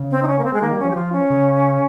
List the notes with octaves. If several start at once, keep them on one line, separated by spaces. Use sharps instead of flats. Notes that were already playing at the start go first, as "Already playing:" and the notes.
Already playing: C#3
C4
D#4
C#4
A#3
C4
G#3
D#3 A#3
G3
C#4
F3
G4
F3 F4
C#4
C#3